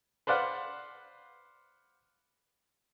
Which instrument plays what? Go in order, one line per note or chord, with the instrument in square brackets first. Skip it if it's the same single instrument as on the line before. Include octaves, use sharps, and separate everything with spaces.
[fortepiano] B4 C5 D5 F5 F#5